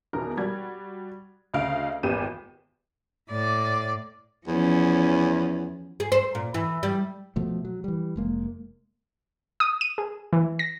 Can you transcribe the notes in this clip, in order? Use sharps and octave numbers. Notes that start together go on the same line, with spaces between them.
E2 B2 D#3 A#4
G3 F#4 G#6
D2 C#3 D#5 F5 D7
G#1 E2 B3 G4 D#7 E7
A2 D5
E2 F3 C#4
G#4
C5
A#2
E3
G3
B2 F3 A3
F#3
E3 G3
F1 G#3 A#3
D#6
D#7
G#4
E3
A#6